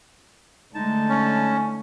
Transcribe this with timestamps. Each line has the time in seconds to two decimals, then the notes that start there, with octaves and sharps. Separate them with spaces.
0.75 D3 G#3 A3 D#4 A5
1.09 C#4